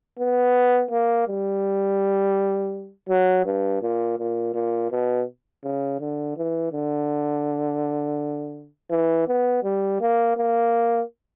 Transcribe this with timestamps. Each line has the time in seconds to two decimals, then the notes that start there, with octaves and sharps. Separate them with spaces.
0.19 B3
0.91 A#3
1.28 G3
3.09 F#3
3.45 G2
3.82 A#2
4.18 A#2
4.54 A#2
4.91 B2
5.64 C#3
6.00 D3
6.37 E3
6.72 D3
8.90 E3
9.28 B3
9.63 G3
10.00 A#3
10.36 A#3